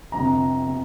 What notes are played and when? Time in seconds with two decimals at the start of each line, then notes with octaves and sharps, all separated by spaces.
0.12 G1 F2 C3 A#5
0.67 C3